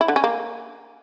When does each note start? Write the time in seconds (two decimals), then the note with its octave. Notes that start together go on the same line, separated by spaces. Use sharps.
0.01 E4
0.08 D3
0.16 C#4
0.24 A#3